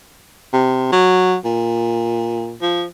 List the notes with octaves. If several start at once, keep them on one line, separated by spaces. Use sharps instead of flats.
C3
F#3
A#2
F3